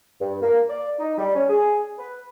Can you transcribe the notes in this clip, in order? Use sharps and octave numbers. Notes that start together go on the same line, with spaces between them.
G2
A#3
D5
D#4
G3
C#4
G#4
B4